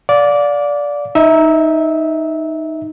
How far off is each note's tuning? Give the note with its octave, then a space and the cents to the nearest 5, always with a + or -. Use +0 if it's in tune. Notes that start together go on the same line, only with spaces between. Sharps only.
D5 -15 F5 +35
D#4 +0 E5 -20